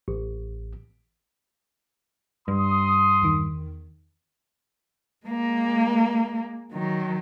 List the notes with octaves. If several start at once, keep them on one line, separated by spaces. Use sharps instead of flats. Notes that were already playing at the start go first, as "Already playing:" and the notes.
A1
G2 C6 D#6
E2 D#3
G#3 A#3
D#3 F#3